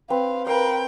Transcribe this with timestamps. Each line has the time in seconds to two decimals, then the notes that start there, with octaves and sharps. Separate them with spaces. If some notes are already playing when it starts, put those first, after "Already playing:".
0.10 C4 B4 F5
0.47 A#4 B4 F5 G5